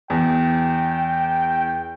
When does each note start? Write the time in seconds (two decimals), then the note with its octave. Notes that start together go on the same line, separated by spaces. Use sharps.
0.10 E2 G5